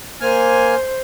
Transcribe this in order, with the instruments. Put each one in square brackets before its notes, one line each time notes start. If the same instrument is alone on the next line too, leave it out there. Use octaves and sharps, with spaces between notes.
[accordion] A#3 G#5 F6 [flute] C5